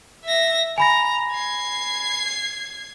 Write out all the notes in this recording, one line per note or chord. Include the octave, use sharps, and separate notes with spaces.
E5 A#6
G#5 A#5 B5 A#6
G#6 C7